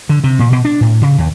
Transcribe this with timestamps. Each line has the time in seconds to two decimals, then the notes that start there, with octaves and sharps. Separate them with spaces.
0.09 D3
0.24 C3
0.39 A#2
0.52 B2
0.65 D4
0.81 A2
1.02 C#3
1.18 D#2